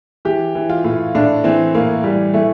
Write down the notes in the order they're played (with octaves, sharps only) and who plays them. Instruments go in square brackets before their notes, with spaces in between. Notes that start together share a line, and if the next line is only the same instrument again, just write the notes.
[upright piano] E3 G4
E3
F4
A2
A2 D4
E3 C4
A2 A#3
E3 G3
E3 A3